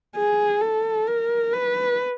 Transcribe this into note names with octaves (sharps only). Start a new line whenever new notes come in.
G#4
A4
A#4
B4